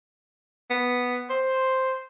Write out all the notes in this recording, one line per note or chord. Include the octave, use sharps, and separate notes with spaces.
B3
C5